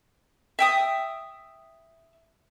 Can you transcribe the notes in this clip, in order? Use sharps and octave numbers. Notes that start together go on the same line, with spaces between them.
E5 G5 D#6